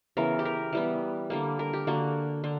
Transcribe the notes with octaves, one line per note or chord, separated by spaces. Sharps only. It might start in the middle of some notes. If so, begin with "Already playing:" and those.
C#3 E3 B3 A#4
G4
A#4
E3 G3 B3
D3 G3 A#3
A#4
G4
D3 A#3 F#4
D3